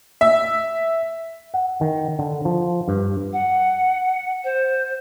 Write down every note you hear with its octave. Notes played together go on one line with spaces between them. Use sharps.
E5
F#5
D#3
D3
F3
G2
F#5
C5